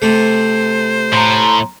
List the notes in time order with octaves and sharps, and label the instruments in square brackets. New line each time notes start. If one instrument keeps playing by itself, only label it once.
[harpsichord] C3 A3 [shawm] C5
[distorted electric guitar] A2 [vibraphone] A#5 C6